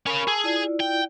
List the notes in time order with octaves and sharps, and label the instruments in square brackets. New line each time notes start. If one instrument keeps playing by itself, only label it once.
[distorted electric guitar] C#4 F5 [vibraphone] A#4 B5 C#6
[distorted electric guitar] G#4 [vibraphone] A5 E6
[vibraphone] E4 F4 D5
[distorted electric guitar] G5